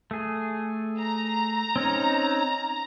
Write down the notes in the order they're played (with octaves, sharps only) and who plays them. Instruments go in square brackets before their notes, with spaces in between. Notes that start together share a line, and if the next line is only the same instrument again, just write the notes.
[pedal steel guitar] A3 G#4
[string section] A#5
[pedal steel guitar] C4 C#4 D#4